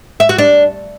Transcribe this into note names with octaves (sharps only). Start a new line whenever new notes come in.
E5
F#4
D4